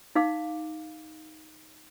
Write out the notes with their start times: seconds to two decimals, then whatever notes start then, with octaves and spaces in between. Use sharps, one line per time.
0.16 D#4 F5 D6